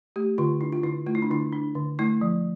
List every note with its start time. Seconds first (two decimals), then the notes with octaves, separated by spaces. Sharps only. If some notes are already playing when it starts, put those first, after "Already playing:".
0.16 A3 G4
0.38 D3 F4
0.61 D4 E4
0.72 F4
0.83 D3 E4
1.07 A3 F4
1.15 E4
1.22 D4
1.30 D3 E4
1.52 D4
1.75 D3
1.99 A3 E4
2.21 F3